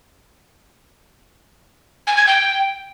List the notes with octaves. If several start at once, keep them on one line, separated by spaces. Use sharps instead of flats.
G#5
G#6
G5